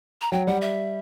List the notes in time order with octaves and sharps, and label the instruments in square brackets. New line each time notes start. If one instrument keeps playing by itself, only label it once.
[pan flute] A#5
[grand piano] F#3 [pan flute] G5
[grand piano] G3 [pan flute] F#5
[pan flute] E5